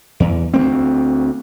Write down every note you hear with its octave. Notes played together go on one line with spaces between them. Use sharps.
E2
D2 A#3 C4